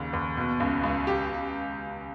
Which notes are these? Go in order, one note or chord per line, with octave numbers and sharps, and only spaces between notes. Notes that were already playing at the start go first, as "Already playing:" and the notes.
Already playing: D#2 C#3
D#2
B2
C#2
C#2
G4